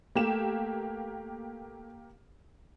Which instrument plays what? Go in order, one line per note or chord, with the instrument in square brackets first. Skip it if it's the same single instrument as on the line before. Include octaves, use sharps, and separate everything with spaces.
[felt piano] A3 [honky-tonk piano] A#3 G4 E7